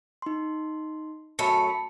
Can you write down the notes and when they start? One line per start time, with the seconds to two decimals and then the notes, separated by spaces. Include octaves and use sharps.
0.22 D#4 C6
1.39 F#2 A3 A5 B5 C#7